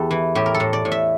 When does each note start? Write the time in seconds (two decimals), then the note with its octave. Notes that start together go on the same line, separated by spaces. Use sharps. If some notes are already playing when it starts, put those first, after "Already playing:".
Already playing: E2 G4 A4
0.11 E3
0.35 A2 G4
0.46 A#4
0.54 A4
0.60 A2
0.73 D5
0.85 A2
0.92 E5